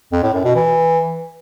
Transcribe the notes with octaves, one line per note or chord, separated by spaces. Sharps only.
F2
A2
F#2
B2
E3